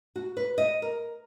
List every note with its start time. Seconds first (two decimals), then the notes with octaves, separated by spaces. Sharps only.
0.16 F#4
0.37 B4
0.58 D#5
0.82 A#4